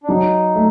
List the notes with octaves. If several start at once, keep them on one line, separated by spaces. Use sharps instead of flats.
D4
F#3 D#4
A3